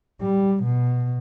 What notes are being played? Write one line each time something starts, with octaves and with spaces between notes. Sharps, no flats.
G3
B2